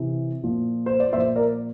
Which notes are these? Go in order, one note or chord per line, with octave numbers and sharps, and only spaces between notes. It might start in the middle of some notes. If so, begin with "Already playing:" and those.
Already playing: C3 E3
A#2 F3
C5
D5
A#2 F3 C5 E5
A#4 D5